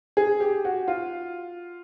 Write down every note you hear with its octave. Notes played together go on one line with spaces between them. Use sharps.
G#4
G4
F#4
F4